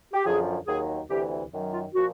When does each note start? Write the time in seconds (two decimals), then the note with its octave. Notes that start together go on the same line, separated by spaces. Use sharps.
0.14 G4
0.25 F#2 D3 F3 G#4
0.67 D#2 D#3 F#3 G#4
1.10 D2 C3 E3 G4
1.52 F#2 D#3 F#3
1.73 F4
1.94 A#2 F3 F#4